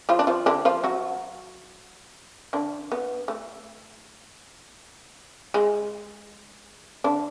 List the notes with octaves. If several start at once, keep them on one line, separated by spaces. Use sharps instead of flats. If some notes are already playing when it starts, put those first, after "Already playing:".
F3 F4
D4
F3 F4
D3 D4
F3 F4
F#3 F#4
D3 D4
B3
A3
G#3
D3 D4